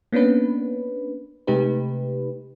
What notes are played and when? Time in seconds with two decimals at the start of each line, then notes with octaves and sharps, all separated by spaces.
0.12 A#3 B3 C#4 D4 B4
1.47 C3 G#3 A3 D#4 G4 B4